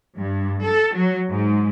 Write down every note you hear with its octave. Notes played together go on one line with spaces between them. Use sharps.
G2
A4
F#3
G#2